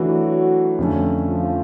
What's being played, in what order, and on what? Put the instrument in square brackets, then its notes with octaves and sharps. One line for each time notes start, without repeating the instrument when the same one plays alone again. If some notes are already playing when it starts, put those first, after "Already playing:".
Already playing: [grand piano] E3 A3 D4 [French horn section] F#3 F#4
[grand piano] F2 D3 F3 A3 C#4
[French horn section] F3 F4